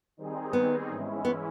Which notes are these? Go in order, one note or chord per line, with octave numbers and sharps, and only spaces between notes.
D#3 G3 C4 D#4 G#4
B3
G#2 E3 G#3 C#4 E4
B3